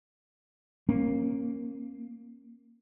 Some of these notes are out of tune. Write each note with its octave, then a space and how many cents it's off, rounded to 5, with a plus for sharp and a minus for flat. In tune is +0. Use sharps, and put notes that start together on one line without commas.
A#3 +0 C#4 -30